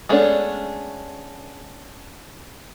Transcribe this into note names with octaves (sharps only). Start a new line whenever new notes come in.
G#3 A3 B3 C#4 D4